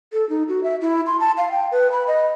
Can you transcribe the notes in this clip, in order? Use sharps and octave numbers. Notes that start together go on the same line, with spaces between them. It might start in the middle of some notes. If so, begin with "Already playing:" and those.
A4
D#4
F#4
E5
E4
C6
A5
F5
G5
B4
B5
D#5